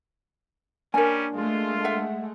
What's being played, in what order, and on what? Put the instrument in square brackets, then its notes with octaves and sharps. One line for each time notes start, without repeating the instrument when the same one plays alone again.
[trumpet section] G3 C#4 [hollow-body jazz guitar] A#3 D4 [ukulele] A#4 G#5
[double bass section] G#3 A3 [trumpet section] F4
[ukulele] E5 F#5